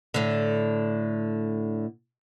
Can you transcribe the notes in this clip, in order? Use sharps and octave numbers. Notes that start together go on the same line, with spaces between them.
A2 D3